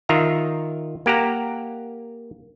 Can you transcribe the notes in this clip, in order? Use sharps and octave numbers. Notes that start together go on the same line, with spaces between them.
D#3 F4 E5 A#5
A#3 G4 F#5 A#5